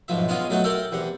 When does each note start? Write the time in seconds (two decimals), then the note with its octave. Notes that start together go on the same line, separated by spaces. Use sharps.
0.08 B1 G#2 F3 E5
0.28 G#3 B3 C#4 F4 D#5
0.50 F#3 A3 D#4 F#4
0.64 A4 A#4 E5 F#5 G5 C6
0.92 E2 C3 F#5